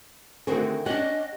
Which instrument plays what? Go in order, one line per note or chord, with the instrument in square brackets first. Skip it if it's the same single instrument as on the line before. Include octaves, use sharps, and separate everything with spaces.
[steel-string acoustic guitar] D3 D#3 A3 [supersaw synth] C4 F#4 G#4 [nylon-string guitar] A#4
[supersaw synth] C#4 D4 [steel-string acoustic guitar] G4 [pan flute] D#5 [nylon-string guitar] F#5